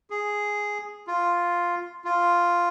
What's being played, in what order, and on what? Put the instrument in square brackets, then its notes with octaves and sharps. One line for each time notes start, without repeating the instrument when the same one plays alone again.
[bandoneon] G#4
F4
F4